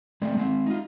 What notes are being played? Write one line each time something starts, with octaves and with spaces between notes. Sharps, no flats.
G#3 A3 C4 D5
G#3 C4
D#4 F4